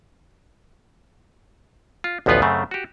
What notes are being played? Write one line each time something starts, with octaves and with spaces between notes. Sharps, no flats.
F4
A1 D2 F3 B3 F4 B4
F#2 C#3 A3 C4
F#4 G4